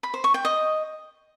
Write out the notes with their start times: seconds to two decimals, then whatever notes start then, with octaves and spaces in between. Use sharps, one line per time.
0.03 B5
0.14 C5
0.24 C#6
0.34 G5
0.45 D#5